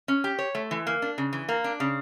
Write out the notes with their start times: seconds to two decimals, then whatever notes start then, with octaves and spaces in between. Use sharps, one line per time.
0.08 C#4
0.24 G4
0.39 C#5
0.55 A3
0.71 E3
0.87 A#3
1.02 D4
1.18 C#3
1.33 E3
1.49 A#3
1.64 D4
1.80 C#3